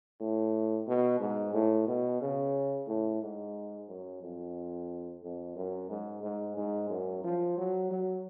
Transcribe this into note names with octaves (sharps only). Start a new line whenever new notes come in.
A2
B2
G#2
A2
B2
C#3
A2
G#2
F#2
F2
F2
F#2
G#2
G#2
G#2
F#2
F3
F#3
F#3